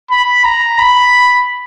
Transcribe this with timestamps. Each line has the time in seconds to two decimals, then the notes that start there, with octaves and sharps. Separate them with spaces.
0.10 B5
0.44 A#5
0.78 B5